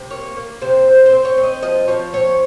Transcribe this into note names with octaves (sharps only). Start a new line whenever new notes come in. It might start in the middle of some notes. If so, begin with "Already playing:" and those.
Already playing: C3
A#3 C#5
A#3
C3 C5
C4 C5
C5
C4
C#5
C4
D#5
F3 D#5
F3 C#5
C4 C#5